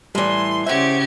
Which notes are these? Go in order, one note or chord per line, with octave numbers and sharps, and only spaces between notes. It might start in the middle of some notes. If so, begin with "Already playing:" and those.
A2 E3 G3 D5 C6
C#3 G4 C5 E5 F#5 G#6